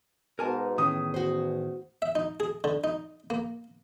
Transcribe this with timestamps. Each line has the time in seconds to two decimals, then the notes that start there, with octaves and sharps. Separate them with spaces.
0.39 G#2 B2 A#4 G#5 A5
0.78 E2 A2 D#3 C#4 D#6
1.14 F#4 C5
2.02 E5
2.15 D#4
2.40 G#4
2.64 D3
2.84 D#4
3.30 A#3